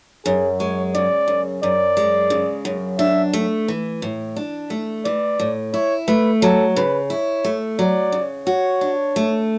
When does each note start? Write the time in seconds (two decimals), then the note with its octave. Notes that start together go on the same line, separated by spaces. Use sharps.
0.25 F#2 G#4
0.59 G#3 C#5
0.94 C#3 D5
1.28 F#2
1.63 F#2 D5
1.97 G#3
2.30 C#3
2.65 F#2
2.99 D4 E5
3.33 A3
3.68 E3
4.02 A2
4.36 D4
4.70 A3
5.05 E3 D5
5.40 A2
5.73 E4 C#5
6.08 A3 B4
6.42 F#3 A4
6.76 C#3 B4
7.10 E4 C#5
7.44 A3
7.79 F#3 D5
8.12 C#3
8.47 F#4 C#5
8.81 D4
9.16 A3